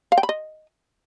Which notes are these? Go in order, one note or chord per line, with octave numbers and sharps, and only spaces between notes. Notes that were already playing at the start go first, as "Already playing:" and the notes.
F5
G5
B5
D#5